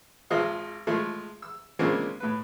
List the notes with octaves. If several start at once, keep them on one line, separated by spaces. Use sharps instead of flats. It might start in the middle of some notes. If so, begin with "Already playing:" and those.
G#1 F3 G#3 D#5 F5
F3 G#3 A3 E4
E6
C#3 F3 G#3 A#3 C4 D4
A2 B4